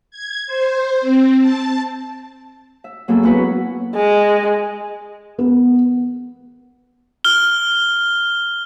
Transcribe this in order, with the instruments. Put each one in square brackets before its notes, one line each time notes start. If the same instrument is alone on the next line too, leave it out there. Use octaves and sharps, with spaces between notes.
[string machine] G#6
C5
C4
A5
[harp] E5
F#3 A#3 B3 G#4 A4
A#3 B3 C#4 E4 F#4 B4
[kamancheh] G#3
[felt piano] B3
[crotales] F6 G7